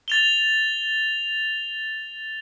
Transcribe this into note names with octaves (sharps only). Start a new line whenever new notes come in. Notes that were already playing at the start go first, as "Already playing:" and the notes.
A6 F7 G7